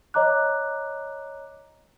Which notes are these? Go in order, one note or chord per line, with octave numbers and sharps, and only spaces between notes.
C#5 D#5 A#5 D6 F#6